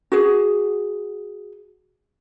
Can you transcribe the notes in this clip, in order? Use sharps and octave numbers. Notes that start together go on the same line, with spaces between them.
F#4 G#4